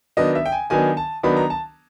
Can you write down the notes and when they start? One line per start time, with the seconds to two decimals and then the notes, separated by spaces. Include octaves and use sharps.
0.17 D#3 F#3 B3 D4 D#5
0.35 E5
0.46 G5
0.52 G#5
0.70 D#3 F#3 B3 D4 G#5
0.97 A5
1.23 D#3 F#3 B3 D4 B5
1.37 A#5
1.50 A5